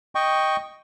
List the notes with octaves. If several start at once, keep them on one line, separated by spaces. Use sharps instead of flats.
D#5 G5 C#6